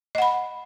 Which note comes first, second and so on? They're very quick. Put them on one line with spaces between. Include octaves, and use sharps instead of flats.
D#5 F#5 B5